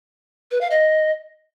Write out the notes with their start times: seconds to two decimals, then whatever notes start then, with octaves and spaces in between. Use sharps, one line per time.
0.51 B4
0.61 F5
0.71 D#5